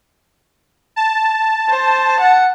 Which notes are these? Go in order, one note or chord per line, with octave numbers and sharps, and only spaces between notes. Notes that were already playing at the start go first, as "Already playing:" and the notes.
A5
C5
F#5